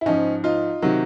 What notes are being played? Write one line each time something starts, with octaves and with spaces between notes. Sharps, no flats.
E4
G#2 F3 C#4 D#4
D#4 F4
C3 D#3 F#3